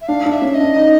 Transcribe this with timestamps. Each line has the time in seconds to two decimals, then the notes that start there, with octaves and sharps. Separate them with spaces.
0.01 E5
0.08 D4 F5
0.25 D4
0.31 E5
0.42 C#4
0.54 D#5
0.60 D4
0.76 D#4